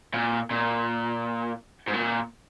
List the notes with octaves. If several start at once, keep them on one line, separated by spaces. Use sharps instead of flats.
A#2
A#2
G#2
A#2